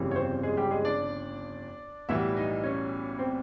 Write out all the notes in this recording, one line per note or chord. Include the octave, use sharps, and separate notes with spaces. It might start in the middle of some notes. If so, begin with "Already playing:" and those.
Already playing: G1 F2 C#3 E3 G3
C#5
C4 C5
G#3 G#4
G3 G4
G#3 G#4
D4 D5
B1 A2 E3 G3 B3 E4 E5
D#4 D#5
C#4 C#5
C4 C5